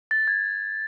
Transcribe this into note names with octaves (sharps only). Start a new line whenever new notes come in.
A6
G#6